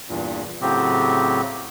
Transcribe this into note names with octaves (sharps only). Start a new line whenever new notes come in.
E2 G2 A#2
A2 C#3 F#3 C4 G4